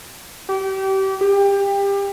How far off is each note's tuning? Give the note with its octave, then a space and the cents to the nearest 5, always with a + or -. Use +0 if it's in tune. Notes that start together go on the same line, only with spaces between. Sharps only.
G4 -30
G4 +25